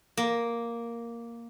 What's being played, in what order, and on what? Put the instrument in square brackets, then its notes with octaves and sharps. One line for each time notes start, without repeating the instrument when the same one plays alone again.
[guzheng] A#3